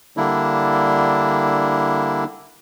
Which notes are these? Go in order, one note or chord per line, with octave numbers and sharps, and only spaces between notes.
D3 G3 A#3 D4 E4